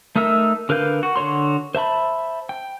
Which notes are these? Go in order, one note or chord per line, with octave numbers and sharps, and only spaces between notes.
A3 D#4 A#4 E5 E6
D3 A#4 B4 F5 G6
F#4
D3 F#4 C#5 C6
C5 E5 A5 B5
G5